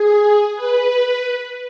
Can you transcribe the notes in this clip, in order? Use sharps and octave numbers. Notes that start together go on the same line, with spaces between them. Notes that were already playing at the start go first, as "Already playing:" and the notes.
Already playing: G#4
B4